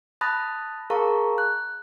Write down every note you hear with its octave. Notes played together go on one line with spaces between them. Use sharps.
A5 B5 D#6 F#6 A6 A#6
G#4 A#4 F5 A5 A#5 C#6
F#6